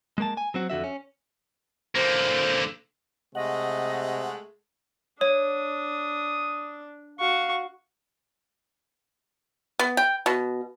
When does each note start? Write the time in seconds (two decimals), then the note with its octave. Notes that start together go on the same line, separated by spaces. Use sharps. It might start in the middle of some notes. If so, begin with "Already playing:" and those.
0.18 G#3 A#3 A5
0.37 G#5
0.54 F#3 C4 F#4
0.70 F2 D3 F#4 E5
0.84 C#4
1.95 D3 A#3 C5
3.35 C3 G#3 A3 D#5 F#5
5.21 D4 C#5 D#6
7.19 F#4 F5 C#6
9.79 B3
9.97 G5
10.26 B2